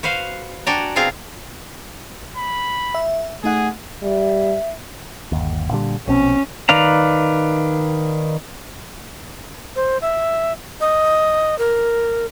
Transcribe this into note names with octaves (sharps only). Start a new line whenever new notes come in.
F#4 B4 C5 F5
D4 F#4 D5 G5 G#5 A#5
B2 C4 F4 G#4 F5 A#5
B5
E5
A3 D#4 G#4 F#5
G3 E5
G1 D#2
A#2 D3 G3
A#1 B2 C4 C#4
D#3 B4 D5 F5 A#5
C5
E5
D#5
A#4